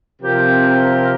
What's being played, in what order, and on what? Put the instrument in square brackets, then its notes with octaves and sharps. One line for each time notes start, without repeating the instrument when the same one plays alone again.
[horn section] C3 F3 C4 G4 A#4